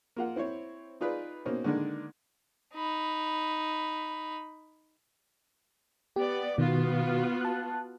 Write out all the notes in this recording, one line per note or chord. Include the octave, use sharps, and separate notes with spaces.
A#3 F4 F#5
C4 E4 C5 C#5
D#4 F4 G#4 B4 D5
B2 A#3 C4 C#4 D#4
D3 D#3 G#3 A#3 D4
D#4 B5
B3 G4 D5
B2 D#3 B3 F4 F#4
A5 F#6